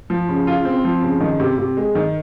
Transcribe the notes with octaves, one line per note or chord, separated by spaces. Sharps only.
F3
C#3
F4
C4
F3
C#3
D#3
C3
C3
G#3
D#3